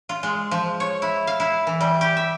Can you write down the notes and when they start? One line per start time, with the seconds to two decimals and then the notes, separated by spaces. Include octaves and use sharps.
0.09 F4
0.23 G#3
0.51 F3
0.80 C#5
1.02 E4
1.27 F5
1.40 E4
1.67 E3
1.81 G3
2.01 G4
2.17 E5